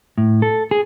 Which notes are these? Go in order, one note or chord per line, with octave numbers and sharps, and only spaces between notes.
A2
A4
G#4